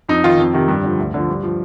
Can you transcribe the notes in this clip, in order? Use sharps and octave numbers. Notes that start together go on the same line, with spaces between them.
F2 D#4
D#3 F4
F2
C3 D#3
G2
D3 F3
D2
D3 F3
G2
F3